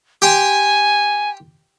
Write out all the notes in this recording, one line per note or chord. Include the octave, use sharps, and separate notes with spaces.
G4 G5 G#5 C6